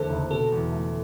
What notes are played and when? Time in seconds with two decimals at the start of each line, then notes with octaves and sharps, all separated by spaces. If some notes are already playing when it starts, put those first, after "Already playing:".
Already playing: E2 D3 A3 A4 C5
0.09 F#1
0.31 B2 A4
0.52 E2
0.72 A3